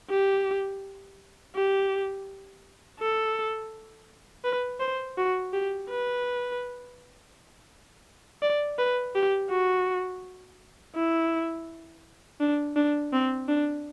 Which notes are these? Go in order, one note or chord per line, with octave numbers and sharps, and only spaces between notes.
G4
G4
A4
B4
C5
F#4
G4
B4
D5
B4
G4
F#4
E4
D4
D4
C4
D4